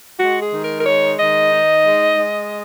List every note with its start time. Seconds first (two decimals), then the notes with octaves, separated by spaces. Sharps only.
0.19 G#3 F#4
0.42 G#4
0.53 D#3
0.64 A#4
0.80 A#4
0.86 G#3 C#5
1.19 D#3 D#5
1.52 D#4
1.85 G#3
2.18 G#3